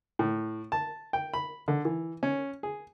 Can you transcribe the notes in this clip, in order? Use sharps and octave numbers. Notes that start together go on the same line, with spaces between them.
A2
A5
G5
B5
D3
E3
C#4
G#4